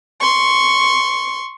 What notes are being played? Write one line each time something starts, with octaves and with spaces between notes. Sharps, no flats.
C6 C#6